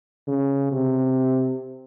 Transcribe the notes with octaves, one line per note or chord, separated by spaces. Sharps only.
C#3
C3